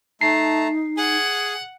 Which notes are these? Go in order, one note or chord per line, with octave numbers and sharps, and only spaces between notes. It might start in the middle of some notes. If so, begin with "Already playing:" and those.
A3 D#4 A5 A#5 C7
G#4 F#5 G#5